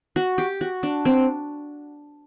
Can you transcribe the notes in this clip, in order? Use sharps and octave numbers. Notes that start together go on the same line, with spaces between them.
F#4
G4
F#4
D4
C4